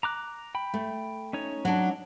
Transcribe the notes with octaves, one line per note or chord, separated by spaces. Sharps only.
A#5 D6 F#6
G5 B5
A3
C#4 D#4 C#5
F#3 D4